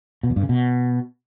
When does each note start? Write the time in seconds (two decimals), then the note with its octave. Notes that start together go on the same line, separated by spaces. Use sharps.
0.23 B2
0.30 E2
0.36 G2
0.43 C#3
0.49 B2